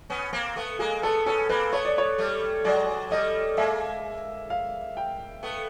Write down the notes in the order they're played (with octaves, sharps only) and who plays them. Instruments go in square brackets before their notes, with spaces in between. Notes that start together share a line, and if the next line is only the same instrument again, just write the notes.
[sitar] B3 C#4
A#3 C4
A3 B3
[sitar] G#3 A#3 [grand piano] G#4
[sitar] A3 B3 [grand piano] A4
[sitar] B3 C#4 [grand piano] A4
[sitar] A#3 C4 [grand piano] B4
[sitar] A3 B3 [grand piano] C#5
[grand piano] D5
C#5
[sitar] G3 A3
[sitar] F#3 G#3 [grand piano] D5
[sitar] G3 A3 [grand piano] D#5
[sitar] G#3 A#3 [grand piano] E5
[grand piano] F5
G5
[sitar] A3 B3